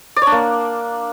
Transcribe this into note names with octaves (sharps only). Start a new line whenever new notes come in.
D5
C#5
D4
A#3